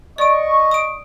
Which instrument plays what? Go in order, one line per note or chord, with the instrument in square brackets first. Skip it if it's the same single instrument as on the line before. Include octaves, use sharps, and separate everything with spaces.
[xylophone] D5 D7 [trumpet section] D#5 C#6
[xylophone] D#6 D7